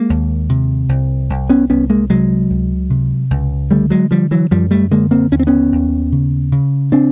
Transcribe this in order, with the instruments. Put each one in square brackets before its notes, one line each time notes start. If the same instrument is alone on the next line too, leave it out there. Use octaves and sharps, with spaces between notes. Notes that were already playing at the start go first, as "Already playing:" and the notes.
Already playing: [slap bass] G#3 A#3
D#2
C3
C2
C2
B3 C#4
C2 B3 C#4
G#3 A#3
C3 F#3 G#3
C#2
C3
C#2
D3 G3 A3
F#3 G#3
D3 F3 G3
E3 F#3
F#2 F3 G3
G3 A3
D3 G#3 A#3
A#3 C4
D#2 C#4
C4
B3 C#4
D#2
C#3
C#3
C#3 C4 D4